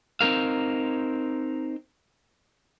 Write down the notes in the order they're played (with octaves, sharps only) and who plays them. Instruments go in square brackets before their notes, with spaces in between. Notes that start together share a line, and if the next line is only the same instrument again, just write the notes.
[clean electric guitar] C4 D#4 A#4 F5